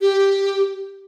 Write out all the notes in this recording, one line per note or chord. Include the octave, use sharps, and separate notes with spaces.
G4